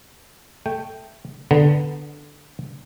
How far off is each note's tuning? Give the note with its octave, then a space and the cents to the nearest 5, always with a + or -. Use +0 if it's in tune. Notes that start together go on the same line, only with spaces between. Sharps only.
A3 +0 G5 +0
D3 +0 B3 +0 A#5 +0